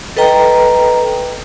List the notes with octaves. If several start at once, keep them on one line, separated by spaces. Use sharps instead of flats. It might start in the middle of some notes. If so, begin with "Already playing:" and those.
A4 B4 D#5 G5 A#5